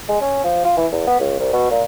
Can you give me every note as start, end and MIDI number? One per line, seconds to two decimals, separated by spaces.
0.09 0.21 56
0.21 0.40 61
0.44 0.61 53
0.65 0.74 65
0.77 0.87 52
0.93 1.06 40
1.07 1.18 59
1.20 1.38 37
1.40 1.51 36
1.53 1.68 47
1.71 1.83 46